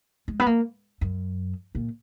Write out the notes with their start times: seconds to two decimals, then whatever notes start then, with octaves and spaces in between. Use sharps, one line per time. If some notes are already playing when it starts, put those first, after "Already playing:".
0.28 G#3
0.40 B3
0.46 A#3
1.01 F#2
1.75 A#2